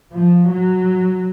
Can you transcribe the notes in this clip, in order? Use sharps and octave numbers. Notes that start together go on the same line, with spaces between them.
F3
F#3